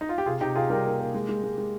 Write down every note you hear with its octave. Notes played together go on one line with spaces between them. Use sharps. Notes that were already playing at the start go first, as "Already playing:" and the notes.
D#4
F4
G4
C3 F4 G#4
C3 D#4 G4
C3 F4 G#4
G3 G4 A#4
A#3
A#3
G#3
G#3
G#3
G#3